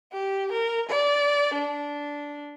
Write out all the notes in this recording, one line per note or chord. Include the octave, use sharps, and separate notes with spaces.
G4
A#4
D5
D4